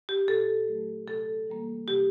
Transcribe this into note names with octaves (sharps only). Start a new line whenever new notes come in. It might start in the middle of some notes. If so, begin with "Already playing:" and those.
G4
A#2 A4
F#3 A3
C3 A4
E3 G3 A#3
C3 G4